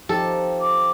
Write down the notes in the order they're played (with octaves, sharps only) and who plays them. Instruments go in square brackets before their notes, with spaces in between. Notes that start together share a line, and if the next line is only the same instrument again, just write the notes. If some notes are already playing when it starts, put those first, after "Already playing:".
[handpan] F3 D#4 G4 [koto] A4
[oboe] D6